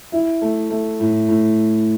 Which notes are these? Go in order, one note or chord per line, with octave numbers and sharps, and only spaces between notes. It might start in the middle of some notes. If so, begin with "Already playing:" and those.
E4
A3
A3
A2
A2